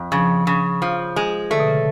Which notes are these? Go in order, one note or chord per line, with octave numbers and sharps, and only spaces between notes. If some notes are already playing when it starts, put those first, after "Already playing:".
Already playing: F2
C#3 F3
C#3
F3
G#3
D3 A3
B2
C#3